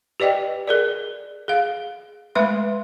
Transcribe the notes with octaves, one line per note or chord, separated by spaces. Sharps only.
G4 B4 D5 D#5 G5
G#4 A#4 D5
G#4 F5
G#3 A3 B4 E5 B5 C6